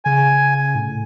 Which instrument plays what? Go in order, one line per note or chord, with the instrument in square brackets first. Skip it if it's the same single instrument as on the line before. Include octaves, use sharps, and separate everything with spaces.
[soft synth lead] C#3 [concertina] G#5
[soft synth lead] A2